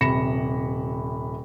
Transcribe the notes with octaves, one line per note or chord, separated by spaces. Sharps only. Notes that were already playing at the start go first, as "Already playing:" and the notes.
D#1 C3 B5 A#6 C#7 E7